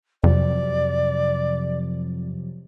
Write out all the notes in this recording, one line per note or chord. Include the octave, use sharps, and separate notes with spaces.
F2 C3 F3 F#3 D5